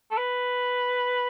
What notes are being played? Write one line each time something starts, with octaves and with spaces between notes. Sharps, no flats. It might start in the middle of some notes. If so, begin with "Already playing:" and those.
A4
B4